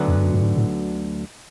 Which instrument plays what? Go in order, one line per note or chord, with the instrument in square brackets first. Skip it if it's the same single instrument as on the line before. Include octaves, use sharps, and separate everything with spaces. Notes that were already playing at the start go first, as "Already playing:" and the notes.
Already playing: [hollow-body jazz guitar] D2 D3 F#3 B3 D#4
[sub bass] F2
G2
F#2
G2
A2
G#2
A2